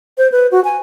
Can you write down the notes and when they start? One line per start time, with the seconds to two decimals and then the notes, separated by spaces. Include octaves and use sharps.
0.18 C5
0.32 B4
0.52 F#4
0.64 G#5